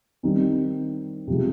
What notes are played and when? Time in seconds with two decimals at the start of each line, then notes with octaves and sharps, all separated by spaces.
0.23 D#3 G3 C4 D#4
1.27 C3 F3 G#3